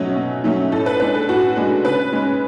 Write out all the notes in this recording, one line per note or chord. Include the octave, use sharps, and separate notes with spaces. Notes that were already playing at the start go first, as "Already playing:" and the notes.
Already playing: B2 F#3 A3 C#4
B2
F#3 A3 C#4
A2 A4
B4
G#3 D4 B4
A4
A2 F#4
G#3 D4
C#3 B4
G#3 C#4